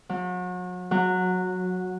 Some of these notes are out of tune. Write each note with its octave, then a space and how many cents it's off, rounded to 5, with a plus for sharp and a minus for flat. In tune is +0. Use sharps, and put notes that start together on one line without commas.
F#3 -35
F#3 -10